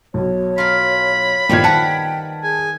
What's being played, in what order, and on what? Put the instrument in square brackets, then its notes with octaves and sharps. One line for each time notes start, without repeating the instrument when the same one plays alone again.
[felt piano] B1 B2 [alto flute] C#5
[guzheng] F4 A#4 [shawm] B5
[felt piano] G1 A#2 G#6 [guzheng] D#3 F3 G3 [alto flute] G5
[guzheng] B4 F#5 [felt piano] A5
[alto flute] G#4 [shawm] G#5